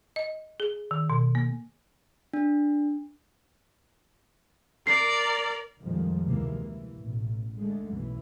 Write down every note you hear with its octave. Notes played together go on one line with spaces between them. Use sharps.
D#5
G#4
D#3
B2
A#3
D4
A#4 D5 C7
F2 A#2 D#3 F3 G3 G#3
D2 C3 E3 G#3 A#3
E3
A1 B2
D3 G#3 A3
B1 F#2 E3